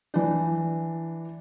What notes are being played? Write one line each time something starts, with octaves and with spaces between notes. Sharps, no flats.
E3 D4